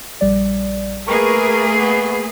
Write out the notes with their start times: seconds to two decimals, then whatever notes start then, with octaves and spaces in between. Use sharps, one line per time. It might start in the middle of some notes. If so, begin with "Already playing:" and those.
0.21 A#1 G3 D5
1.08 A3 A#3 G#4 A#4 B4 C#6
1.80 B3